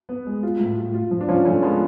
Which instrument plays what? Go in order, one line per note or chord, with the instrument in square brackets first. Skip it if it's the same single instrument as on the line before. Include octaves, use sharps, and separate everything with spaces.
[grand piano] B3
G#3
F4
A2
F4
F4
F3
[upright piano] D4
[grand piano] F3 [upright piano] C#4 F4
[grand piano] F3 [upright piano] A3 C#4
[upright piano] G#3 B3 [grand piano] F4